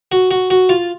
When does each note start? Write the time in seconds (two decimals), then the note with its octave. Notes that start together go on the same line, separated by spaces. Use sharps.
0.12 F#4
0.31 F#4
0.50 F#4
0.69 F4